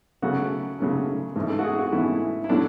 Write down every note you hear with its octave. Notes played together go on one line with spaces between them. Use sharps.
C#3 F#3 A3 C#4 F#4
C#3 F#3 A3 C#4
G#2 E3 A3 C#4
A4
F#4
G#4
F#4
G#2 E3 A3 C#4 E4
E4
A2 F#3 A3 C#4 D4